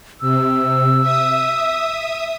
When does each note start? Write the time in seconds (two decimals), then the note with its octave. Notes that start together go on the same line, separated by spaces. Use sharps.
0.21 C3 E6
1.01 E5 D#6